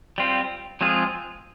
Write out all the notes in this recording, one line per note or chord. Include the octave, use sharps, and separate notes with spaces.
G3 C4 F4
F3 G#3 C4 F4 G#4